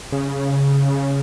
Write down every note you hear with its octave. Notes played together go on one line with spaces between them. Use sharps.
C#3